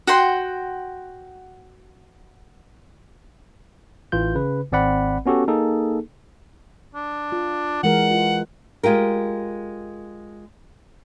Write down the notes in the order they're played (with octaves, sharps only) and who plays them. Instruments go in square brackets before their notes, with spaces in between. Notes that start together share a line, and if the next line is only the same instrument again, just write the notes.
[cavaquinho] F#4 F#5 G5 C6
[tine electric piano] A1 E3 F4 G6
C#3 B4
G#1 C4 D5 F#5 B5
B3 C#4 F#4 G4 A4
A#3 D#4 G#4 A4
[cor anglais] D4
[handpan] F4
[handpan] E3 G#3 A#4 [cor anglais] F#5
[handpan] F4
[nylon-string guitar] G#3 F4 G4 A#4